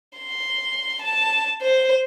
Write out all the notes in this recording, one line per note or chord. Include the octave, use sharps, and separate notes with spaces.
C6
A5
C5